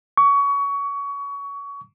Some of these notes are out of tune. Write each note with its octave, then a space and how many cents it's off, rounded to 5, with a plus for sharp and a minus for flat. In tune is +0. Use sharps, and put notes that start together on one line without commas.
C#6 +25